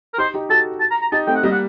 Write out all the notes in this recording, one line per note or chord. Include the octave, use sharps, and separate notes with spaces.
A#4
D#4 G4 C5
D#4 G4
F#4 A4 A5
A5
A#5
A#5
D#4 G4 A5
A3 C4 G5
F#5
G3 A#3 D#5
F#5